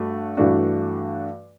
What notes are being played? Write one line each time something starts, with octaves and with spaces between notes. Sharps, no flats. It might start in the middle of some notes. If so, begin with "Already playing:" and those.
Already playing: G2 A3 F#4
G2 E3 A3 D4 F#4